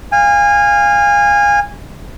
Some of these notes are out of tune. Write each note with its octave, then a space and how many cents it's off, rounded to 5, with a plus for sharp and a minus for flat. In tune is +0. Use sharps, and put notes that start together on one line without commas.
F5 +0 G#5 -25